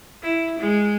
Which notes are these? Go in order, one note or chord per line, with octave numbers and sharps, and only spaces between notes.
E4
G#3